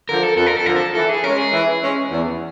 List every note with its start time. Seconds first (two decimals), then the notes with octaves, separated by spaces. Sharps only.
0.09 D3 F3 A#4
0.23 A4
0.37 F2 A4
0.47 A#4
0.56 A4
0.66 D3 F3 A#4
0.76 A4
0.95 E3 A4
1.09 G#4
1.24 G#3 C#4 A#4
1.38 G#4
1.53 E3
1.82 G#3 C#4
2.11 E2